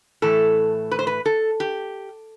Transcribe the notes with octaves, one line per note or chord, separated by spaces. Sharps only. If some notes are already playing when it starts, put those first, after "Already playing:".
A2 E3 A3 A4
B4
C5
B4
A4
G4